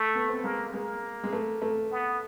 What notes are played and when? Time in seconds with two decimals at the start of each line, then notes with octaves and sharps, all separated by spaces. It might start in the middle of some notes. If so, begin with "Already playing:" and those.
Already playing: A3
0.15 B3
0.29 C4
0.44 G#3 A#3
0.73 G#3 A#3
1.23 G#3
1.33 A3
1.62 A3
1.91 B3